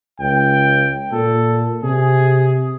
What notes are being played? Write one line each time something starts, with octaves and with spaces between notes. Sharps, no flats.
C#2 G5
A#2 A4
C3 G#4